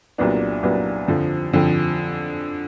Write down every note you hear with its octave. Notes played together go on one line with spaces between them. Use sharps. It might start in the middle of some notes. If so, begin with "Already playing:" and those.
C2 A#2 F#3 B3 D4
C2 A#2 F#3 B3 D4
F2 D3 F3
F2 D3 F3